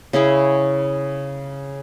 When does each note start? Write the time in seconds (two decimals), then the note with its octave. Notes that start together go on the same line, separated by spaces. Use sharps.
0.13 C#3 C#4 E4 G#4